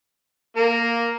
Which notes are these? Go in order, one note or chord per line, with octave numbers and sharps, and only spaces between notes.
A#3 A#4